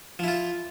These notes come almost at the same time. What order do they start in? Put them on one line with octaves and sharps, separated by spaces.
F3 E4 F4